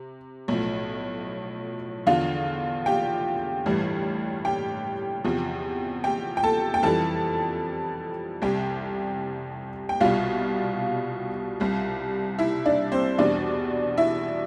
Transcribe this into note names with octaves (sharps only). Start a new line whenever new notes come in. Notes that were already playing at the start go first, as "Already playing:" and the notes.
Already playing: C3
B1 A2 F3
E2 D3 F3 F4 F5
G4 G5
A1 G2 E3 G3
G4 G5
E2 C3 F3
G4 G5
G5
A4 A5
G5
F2 E3 G3 A4 A5
C2 C3 G3 G4 G5
G5
C2 B2 G3 F4 F5
C2 C3 G3
E4 E5
D4 D5
C4 C5
E2 B2 G3 D4 D5
E4 E5